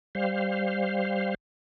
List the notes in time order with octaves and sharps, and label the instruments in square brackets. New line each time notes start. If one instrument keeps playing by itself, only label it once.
[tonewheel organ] G3 C5 F5